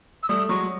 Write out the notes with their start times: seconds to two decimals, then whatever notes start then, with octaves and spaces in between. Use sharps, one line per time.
0.23 E6
0.29 G3 A3 D#6
0.49 F#3 G#3 C#6